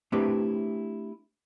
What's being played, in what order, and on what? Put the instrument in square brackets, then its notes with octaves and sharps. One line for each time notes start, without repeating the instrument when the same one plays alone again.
[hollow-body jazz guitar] A3 C4 D4 E4 G4 B4